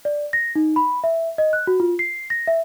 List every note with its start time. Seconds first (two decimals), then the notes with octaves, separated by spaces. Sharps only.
0.05 D5
0.33 A#6
0.55 D#4
0.76 B5
1.04 E5
1.38 D#5
1.53 F#6
1.67 F#4
1.80 F4
1.99 C7
2.30 A#6
2.47 E5